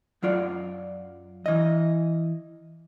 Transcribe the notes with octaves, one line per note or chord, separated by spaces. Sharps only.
F#2 F#3 F4 D5
E3 D#5